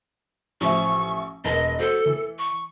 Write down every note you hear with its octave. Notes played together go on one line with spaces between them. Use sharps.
A1 F3 E5 C#6
E1 A#4 B4 D#5
F#4 A4 C5
E3
C#6